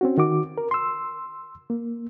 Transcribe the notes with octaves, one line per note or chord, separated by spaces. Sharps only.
C4 C#4 F#4
D#3 F#4 D6
A#4
C6 E6
A#3